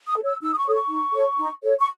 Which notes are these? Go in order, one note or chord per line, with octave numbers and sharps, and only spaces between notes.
D#6
A4
C#5 E6
D#4 E6
D#6
C#6
A4 C#5 D#6
C#6
D#4
A4 C#5
D#4
A4 C#5
C#6